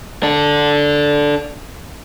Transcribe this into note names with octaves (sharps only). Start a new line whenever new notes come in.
D4 A4